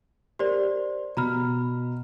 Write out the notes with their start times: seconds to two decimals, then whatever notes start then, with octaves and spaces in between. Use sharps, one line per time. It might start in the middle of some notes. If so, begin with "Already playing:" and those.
0.39 G4 A#4 C5 D5
1.17 B2 A#5 B5 F6